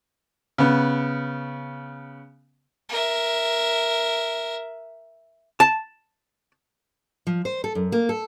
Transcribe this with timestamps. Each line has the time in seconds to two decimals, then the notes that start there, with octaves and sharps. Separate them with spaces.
0.58 C#3 B3
2.89 A#4 E5
5.60 A5
7.27 F3
7.45 C5
7.64 A4
7.75 F#2
7.92 A#3
8.09 A4